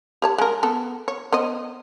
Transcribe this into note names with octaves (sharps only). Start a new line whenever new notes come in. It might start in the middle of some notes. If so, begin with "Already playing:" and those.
G4 C#5 A5
G#3 A#4
B3 A4
C#5
B3 C5 D#5